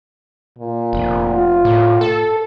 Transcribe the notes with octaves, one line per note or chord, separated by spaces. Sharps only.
A#2
F1
F4
A2
A4